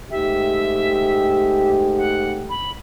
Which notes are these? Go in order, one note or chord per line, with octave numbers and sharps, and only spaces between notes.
G#2 A3 G4 E5
F#5
B5